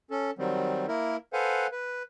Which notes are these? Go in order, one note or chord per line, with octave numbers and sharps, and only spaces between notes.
C#4 A4
D#3 F#3 G3 C4
A#3 E4 A#4
A4 B4 C5 F5 F#5 G#5
B4